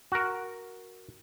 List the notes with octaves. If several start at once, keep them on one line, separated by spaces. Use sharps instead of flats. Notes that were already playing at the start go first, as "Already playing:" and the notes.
F#4 A#4